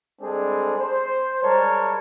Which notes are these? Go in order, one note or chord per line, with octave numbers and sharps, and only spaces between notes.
G3 G#3 C4 D4 G#4 A4
C5
G3 G#3 A#4 C#5 A5